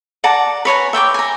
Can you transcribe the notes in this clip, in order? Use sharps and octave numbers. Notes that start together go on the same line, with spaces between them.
D5 F#5 A5 A#5
B4 C#5 G#5 A#5
E5 G5 A5 D6
G#5 A#5